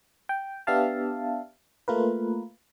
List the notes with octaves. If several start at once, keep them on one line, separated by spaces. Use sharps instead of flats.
G5
B3 D4 G4 E5 F5 A5
A3 A#3 F4 A#4 B4